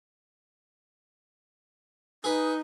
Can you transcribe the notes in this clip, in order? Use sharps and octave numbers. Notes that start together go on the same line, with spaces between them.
D#4 G#4 B4